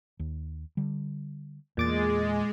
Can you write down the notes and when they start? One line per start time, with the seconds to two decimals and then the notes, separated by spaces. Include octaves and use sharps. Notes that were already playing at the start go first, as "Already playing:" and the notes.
0.19 D#2
0.77 D3 G3
1.77 E2 A#2 G#3 D6 A6